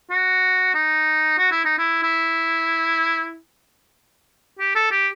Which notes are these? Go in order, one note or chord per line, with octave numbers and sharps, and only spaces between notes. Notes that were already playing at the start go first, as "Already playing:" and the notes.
F#4
D#4
F#4
E4
D#4
E4
E4
G4
A4
G4